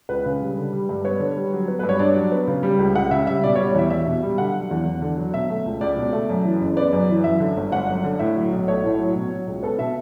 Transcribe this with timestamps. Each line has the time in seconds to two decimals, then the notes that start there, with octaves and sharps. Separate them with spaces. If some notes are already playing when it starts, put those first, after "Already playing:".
0.09 C#2 B4
0.26 C#3
0.42 G3
0.57 D3
0.72 G3
0.89 G2
1.04 B3 C#5
1.20 D3
1.36 G3
1.53 F#3
1.68 B3
1.79 G2 B4
1.89 C#5
1.99 D4 D5
2.15 F#3
2.32 B3
2.47 C#3
2.63 G3
2.79 C#2
2.95 C#2 F#5
3.11 C#3 E5
3.27 G3 E5
3.44 B2 D5
3.55 C#5
3.59 G3
3.67 D5
3.74 E2 E5
3.90 E2 E5
4.07 B2
4.23 G3
4.38 D3 F#5
4.54 F#3
4.71 E2
4.85 E2
5.02 D3
5.17 F#3
5.34 B2 E5
5.49 A3
5.66 C#2
5.81 C#2 D5
5.97 B2
6.13 A3
6.29 F#2
6.45 E3
6.61 F#1
6.77 B3 D5
6.93 F#2
7.09 E3
7.24 F#2 E5
7.40 D3
7.57 G1
7.72 G1 F#5
7.88 F#2
8.04 D3
8.19 A2 E5
8.36 F#3
8.52 B1
8.68 A3 C#5
8.84 A2
8.99 F#3
9.16 B2
9.31 F#3
9.48 C#2
9.63 B3 A4
9.78 B2 E5